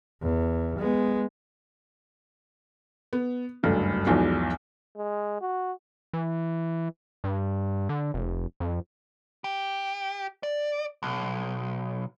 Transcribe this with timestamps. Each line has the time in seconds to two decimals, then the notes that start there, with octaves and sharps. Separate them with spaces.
0.22 E2
0.78 G#3 B3
3.13 B3
3.63 F#1 D2 G2 D3
4.06 B1 E2 G#2 F3 G#3
4.97 G#3
5.41 F#4
6.13 E3
7.24 G2
7.89 D3
8.14 F1
8.60 F2
9.44 G4
10.43 D5
11.03 B1